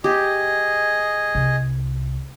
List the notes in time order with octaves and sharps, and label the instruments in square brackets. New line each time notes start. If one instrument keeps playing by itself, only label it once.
[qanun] G4 [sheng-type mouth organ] G#4 D#5
[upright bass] C2